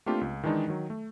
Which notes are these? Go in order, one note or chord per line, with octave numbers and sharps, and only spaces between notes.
A3 A#3 C4 D4 F4 G4
C#2
D#3 E3 G#3 D4 D#4
D#3 F#3
A3